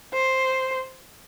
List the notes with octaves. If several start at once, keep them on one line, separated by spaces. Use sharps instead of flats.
C5